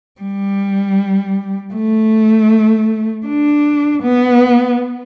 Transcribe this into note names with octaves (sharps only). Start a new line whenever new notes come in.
G3
A3
D4
B3